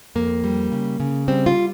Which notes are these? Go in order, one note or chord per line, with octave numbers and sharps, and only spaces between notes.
F2 A#3
G3
C#3
C#3
G3 C4
F4